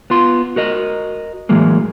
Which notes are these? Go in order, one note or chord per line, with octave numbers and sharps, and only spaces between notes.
B3 F4 C6
F#4 A#4 D#5
A2 E3 F#3 G#3 A#3